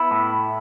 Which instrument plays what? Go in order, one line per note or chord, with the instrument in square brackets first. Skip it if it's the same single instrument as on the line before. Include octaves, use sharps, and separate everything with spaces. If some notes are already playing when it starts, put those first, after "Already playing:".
Already playing: [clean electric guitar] B3 E4
A2